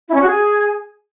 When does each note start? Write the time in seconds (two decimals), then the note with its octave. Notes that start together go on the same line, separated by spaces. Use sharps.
0.08 E4
0.15 C#4
0.21 F#4
0.27 G#4